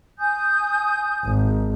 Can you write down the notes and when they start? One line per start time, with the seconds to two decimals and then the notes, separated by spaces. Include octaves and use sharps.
0.19 G#5 D#6 G6
1.24 G#1